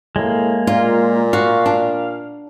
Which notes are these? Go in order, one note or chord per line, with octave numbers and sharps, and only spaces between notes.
A2 G#3 A#3
A#2 F4
F#4 F5
D4